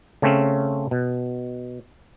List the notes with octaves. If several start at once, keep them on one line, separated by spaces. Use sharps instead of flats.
C#3 A3 C4 C#4
B2